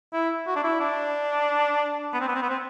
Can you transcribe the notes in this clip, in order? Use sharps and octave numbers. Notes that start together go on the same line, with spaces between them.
E4
F#4
D4
E4
D4
B3
C4
B3
C4
B3
C4